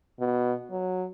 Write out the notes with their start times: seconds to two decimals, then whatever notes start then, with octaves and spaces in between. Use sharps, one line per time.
0.20 B2
0.71 F#3